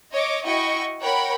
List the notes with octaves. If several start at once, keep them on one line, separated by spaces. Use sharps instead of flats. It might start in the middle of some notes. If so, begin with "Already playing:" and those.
C#5 D#5 D6
E4 F#4 D#5 G5 C#6
A#4 C#5 F#5 G5 B5